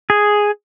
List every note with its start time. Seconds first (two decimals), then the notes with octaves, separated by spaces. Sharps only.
0.10 G#4